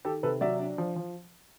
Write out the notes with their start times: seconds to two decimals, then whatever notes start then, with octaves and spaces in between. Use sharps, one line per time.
0.05 D#3 G4 A4
0.23 C3 A4 B4
0.41 F#3 D5 E5
0.59 D4
0.78 F3
0.96 F3